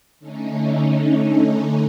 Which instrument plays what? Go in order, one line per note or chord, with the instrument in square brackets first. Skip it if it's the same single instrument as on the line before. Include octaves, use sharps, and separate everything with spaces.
[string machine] D3 A3 C#4 D#4